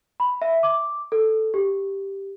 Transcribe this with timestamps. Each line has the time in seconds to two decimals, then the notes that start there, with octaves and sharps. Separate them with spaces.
0.20 B5
0.42 E5
0.63 D6
1.12 A4
1.54 G4